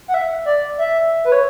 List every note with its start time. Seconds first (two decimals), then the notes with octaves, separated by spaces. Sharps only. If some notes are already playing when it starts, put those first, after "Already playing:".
0.08 F#5
0.14 E5
0.45 D5
0.78 E5
1.25 B4
1.32 C#5